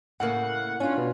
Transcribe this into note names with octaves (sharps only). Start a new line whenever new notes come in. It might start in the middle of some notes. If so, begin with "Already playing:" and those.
A2 C#3 A#3 F#5
C#4 D4 F4
B2